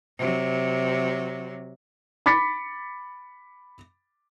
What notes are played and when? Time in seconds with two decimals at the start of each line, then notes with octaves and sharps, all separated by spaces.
0.18 C3 F#3
2.26 B5 D6 A6 B6 C#7